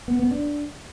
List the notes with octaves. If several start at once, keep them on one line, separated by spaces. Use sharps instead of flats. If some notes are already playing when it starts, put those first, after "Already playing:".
B3
B3
D4